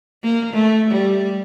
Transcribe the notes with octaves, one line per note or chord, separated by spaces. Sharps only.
A#3
A3
G3